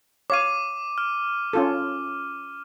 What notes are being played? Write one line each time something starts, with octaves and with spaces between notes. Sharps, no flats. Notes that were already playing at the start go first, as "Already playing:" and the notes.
C#5 F5 D6 D#7
F6
C#4 F4 A4